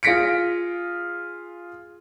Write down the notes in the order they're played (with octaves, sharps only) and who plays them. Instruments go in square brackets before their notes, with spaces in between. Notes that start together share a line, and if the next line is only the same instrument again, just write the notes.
[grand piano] F4 G#4 A#6 B6 C#7 D7